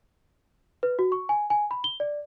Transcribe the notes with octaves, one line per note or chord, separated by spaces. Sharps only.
B4
F#4
C#6
G#5
G#5
B5
G7
D5